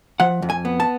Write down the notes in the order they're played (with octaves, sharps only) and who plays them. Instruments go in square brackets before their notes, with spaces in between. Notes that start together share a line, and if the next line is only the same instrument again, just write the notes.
[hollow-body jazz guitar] F3 F#5
F2
G#5
B3
A5